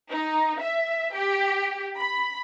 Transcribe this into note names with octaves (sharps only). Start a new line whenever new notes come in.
D#4
E5
G4
B5